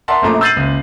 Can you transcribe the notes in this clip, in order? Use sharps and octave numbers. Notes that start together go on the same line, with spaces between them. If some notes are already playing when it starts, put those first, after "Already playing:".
A#4 D5 E5 F#5 A5 C6
A#1 F#2 A#2 A3 A#5 D6
E6 G6 A6 C7 D#7 F#7
F#1 C#2